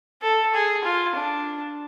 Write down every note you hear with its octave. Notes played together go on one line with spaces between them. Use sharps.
A4
G#4
F4
D4